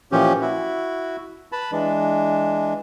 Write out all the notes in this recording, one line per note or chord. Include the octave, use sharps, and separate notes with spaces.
A#2 E3 F3 C#4 G4
E4 F#4
B4 A5 B5
E3 G#3 D4